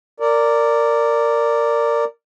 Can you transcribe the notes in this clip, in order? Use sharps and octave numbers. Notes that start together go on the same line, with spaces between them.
A#4 D5